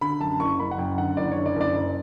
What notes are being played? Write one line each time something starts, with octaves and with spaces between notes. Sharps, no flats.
D3 B5
F#2 A5
F#1 C#6
F#1 B5
F#5
F#2 G5
D3 F#5
F#1 D5
D3 C#5
D5
F#1 D5
F#1